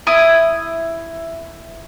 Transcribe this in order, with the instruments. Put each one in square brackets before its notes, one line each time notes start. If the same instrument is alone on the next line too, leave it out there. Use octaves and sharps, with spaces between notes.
[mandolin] E4 D#6